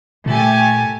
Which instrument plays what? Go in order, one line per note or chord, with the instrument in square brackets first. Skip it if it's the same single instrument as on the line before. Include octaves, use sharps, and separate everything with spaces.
[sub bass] A#2 [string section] A3 G4 G#5